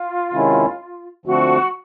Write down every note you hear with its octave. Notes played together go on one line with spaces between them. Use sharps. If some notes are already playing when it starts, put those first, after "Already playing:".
Already playing: F4
C3 D#3 G#3 C#4 E4
D3 F3 A3 C4 F#4